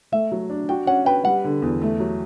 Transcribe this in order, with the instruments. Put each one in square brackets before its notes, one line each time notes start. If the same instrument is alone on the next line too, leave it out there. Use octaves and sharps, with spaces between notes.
[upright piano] A3 [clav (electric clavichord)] E5
[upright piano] F#3
D4
[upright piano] F#4 [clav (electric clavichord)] G5
[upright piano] C#4 [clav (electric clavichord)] F#5
[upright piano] B4 [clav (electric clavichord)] G5
[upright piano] G3 [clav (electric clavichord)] F#5
[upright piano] D3
E2
A3
F#3